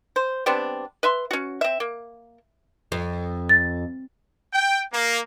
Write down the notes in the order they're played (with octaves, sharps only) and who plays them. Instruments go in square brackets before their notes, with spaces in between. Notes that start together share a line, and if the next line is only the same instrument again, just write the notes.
[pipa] C5
G3 B3 C4 D4
B4 E5 C6
C#4 F#4
C4 E5
A#3
[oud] F2
[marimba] A6
[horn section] G5
A#3